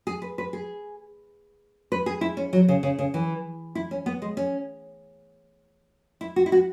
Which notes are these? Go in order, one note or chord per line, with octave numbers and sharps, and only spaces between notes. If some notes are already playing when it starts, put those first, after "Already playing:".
G#4
B4
B4
G#4
B4
G#4
E4
C#4
F#3
C#3
C#3
C#3
E3
E4
C#4
B3
G#3
C#4
E4
F#4
E4
F#4